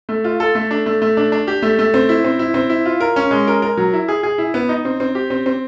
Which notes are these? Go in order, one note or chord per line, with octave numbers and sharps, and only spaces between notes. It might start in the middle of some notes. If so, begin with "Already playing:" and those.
A3
F4
A4
A3
D4
A3
A3
D4
D4
G4
A3
A3
C4
E4
C4
E4
C4
E4
F4
A#4
C#4
G#3
A#4
A#4
F#3
E4
G#4
G#4
E4
B3
D#4
C4
C4
G4
C4
C4